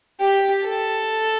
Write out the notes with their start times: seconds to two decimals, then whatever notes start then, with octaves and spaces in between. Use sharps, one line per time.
0.21 G4
0.64 A4